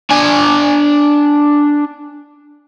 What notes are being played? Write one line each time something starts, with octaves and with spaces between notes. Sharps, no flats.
D4 G#5